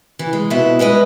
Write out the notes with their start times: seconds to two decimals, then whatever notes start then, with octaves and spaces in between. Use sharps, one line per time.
0.19 E3
0.33 G#3
0.50 F2 B2 B3 E4 E5
0.79 G3 G#3 B4 D#5